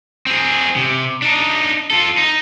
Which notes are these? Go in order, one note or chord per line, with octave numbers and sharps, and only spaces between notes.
C4 G#4
C3
D4 D#4
F4 A4
D#4